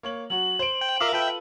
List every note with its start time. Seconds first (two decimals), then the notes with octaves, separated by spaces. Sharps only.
0.03 A#3 C#5 F#7
0.30 F#3 F#4 F#7
0.59 C5 D7
0.81 G5
1.00 F4 A#4 E5 F5 D6 E6
1.13 F4 A4 B4 E5 G5